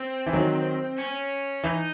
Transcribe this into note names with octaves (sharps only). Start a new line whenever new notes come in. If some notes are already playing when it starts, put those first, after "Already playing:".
Already playing: C4
E3
D#3 F#3
C#4
E3 D#4